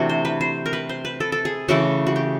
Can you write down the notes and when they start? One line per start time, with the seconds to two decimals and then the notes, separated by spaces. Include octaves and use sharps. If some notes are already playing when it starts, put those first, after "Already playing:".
Already playing: C3 E3 A3 D4 F#4
0.09 C5
0.25 B4
0.41 C5
0.66 A#4
0.73 B4
0.89 C5
1.05 B4
1.20 A4
1.32 A4
1.45 G#4
1.68 C#3 E3 A3 F#4
2.07 F#4
2.16 G4